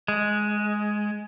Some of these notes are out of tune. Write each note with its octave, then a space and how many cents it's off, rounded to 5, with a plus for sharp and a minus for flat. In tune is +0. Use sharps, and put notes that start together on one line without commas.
G#3 +10